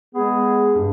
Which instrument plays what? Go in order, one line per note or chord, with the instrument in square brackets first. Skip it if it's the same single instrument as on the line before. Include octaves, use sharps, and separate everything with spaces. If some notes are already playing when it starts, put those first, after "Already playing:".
[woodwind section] G#3 B3 G#4
[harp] G2